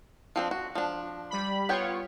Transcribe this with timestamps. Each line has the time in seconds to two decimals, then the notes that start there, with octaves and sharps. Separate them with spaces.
0.36 F3 C4 D4
0.51 F#4
0.75 F3 D4
1.30 G3 B5
1.69 B3 F4 C#5 G5